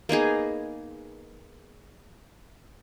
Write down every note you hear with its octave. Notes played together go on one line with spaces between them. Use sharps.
A#3 B3 D#4 G#4